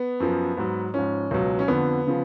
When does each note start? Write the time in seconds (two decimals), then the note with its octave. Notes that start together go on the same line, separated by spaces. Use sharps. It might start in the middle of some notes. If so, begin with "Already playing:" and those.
Already playing: B3
0.20 F#2 F3
0.57 G#2 F#3
0.94 G#2 F3 C#4
1.31 C#2 B2 F#3
1.59 C#4
1.68 F2 D3 F3 B3
2.07 C#3 F3